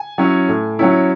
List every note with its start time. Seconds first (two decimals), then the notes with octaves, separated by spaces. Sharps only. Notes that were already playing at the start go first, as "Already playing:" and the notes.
Already playing: G#5
0.18 F#3 C#4 E4
0.49 A2
0.79 F#3 C#4 E4